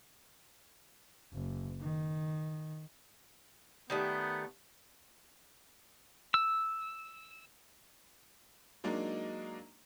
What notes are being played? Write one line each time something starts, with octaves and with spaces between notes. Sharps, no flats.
F#1
D#3
D#3 G3 A3 B3
E6
F#3 G#3 A#3 D4 D#4